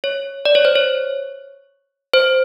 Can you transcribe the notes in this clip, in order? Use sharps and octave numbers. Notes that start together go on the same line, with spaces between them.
C#5
D5
C#5
C5
C#5
C5